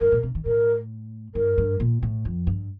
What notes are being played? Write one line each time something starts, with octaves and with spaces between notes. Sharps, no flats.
G2 A#4
A#2
C3
D#3
A2 A#4
G2 A#4
G2
A#2
A2
F2
G2